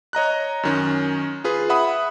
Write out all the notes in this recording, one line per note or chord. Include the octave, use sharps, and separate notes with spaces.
C#5 D#5 A#5 F#6
F#2 D#3 C#4
F4 G#4 B4
E5 F#5 B5 D#6